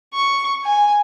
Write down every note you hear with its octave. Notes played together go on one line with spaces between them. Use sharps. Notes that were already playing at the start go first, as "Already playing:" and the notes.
C#6
G#5